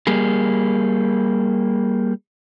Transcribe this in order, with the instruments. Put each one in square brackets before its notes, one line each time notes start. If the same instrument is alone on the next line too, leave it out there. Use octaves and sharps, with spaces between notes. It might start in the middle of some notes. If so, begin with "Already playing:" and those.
[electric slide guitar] G3 A#3 G#4